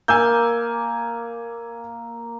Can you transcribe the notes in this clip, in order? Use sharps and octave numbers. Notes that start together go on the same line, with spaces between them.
A#3 G#5 E6 G6